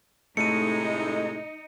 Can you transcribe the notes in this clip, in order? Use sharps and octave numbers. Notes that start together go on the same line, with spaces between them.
A2 C3 G#3 A3 D#4 C#7 D#7